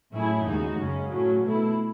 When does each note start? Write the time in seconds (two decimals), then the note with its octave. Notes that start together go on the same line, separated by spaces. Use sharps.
0.13 A2 F#3 C#4 E4 G#4
0.45 D#2 C#3 G#3 D#4 F#4
0.78 F#2 C#3 G#3 C#4
1.10 A2 F#3 C#4
1.42 B2 A3 E4